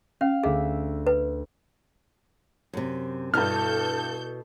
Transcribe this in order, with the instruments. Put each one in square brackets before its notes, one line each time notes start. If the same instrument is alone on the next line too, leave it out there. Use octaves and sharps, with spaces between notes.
[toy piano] C#4 [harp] F5
[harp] D2 E5 C7 [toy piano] G#4
[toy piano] B4
[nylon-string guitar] F#2 C3
[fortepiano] G2 F6 [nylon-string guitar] B2 B3 E4 [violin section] A4 G6